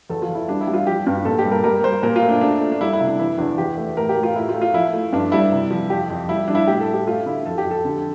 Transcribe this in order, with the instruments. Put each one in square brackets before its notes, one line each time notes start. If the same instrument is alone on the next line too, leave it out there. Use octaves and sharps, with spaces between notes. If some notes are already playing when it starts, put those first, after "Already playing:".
[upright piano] E2 A4
F4
E2
E4
G3 D4
E4
G3
F4
F3 G4
G2
A#2 A4
G4
G3
A#4
G3 A#4
G3 C5
A#2 A#4
F4
A3
D4
A3 D4
A3
D4
G3 E4
E4
C3
D4
E3 E4
E2 D4
E2 G4
A3
A2 A#4
G4
A2
F4
A3 E4
F4
A3
F4
F3 E4
A3
G2 D4
G3 E4
C3
F3
F2 G4
F2
G3 E4
G3 D4
E4
A2 G4
A4
A3
G4
A3 F4
D3 E4
F2 A4
G4
F2
A4
D3